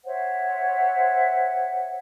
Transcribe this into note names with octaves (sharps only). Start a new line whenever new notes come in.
C5 C#5 E5 F#5